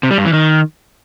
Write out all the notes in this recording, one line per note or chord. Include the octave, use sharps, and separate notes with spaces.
C3
G3
G2
E3
D#3